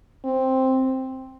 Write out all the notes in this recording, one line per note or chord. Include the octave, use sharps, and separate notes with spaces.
C4